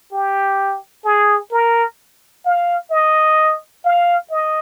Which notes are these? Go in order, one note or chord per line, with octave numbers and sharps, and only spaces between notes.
G4
G#4
A#4
F5
D#5
F5
D#5